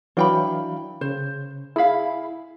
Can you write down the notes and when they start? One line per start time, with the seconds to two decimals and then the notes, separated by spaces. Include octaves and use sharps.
0.17 E3 F#3 D4 F5 G5 B5
1.01 C#3 C5
1.76 E4 G#4 F5 B5